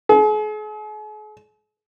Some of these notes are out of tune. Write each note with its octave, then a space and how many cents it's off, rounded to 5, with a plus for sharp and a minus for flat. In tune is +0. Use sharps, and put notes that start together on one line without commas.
G#4 +45